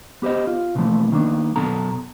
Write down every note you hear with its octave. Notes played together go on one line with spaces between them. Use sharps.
B3 G4 B4 C5 D#5
F4
B2 D3 E3 F3 A3 A#3
D#3 A#3 B3 D4
F#2 B2 A4 A#5